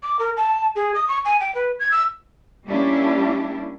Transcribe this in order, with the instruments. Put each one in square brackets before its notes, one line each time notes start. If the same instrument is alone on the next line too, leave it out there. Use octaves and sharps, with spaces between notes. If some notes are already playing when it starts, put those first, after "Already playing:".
[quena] D6
A#4
A5
G#4
D#6
C#6
G#5
G5
B4
G#6
E6
[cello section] G3 A#3 C#4 D4 E4 G4